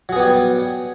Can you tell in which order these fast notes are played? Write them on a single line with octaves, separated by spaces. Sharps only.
F#3 G#4 B3 G4 G3